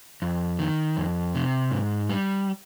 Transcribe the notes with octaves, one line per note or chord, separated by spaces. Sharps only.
F2
D#3
F2
C3
G#2
G3